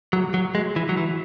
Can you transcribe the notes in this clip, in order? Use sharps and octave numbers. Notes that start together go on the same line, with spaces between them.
F#3
F#3
G#3
E3
F#3
E3